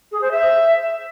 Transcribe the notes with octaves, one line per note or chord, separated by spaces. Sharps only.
G#4
C5
E5